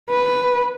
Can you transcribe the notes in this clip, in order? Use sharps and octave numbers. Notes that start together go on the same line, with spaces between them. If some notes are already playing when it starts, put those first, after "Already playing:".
B4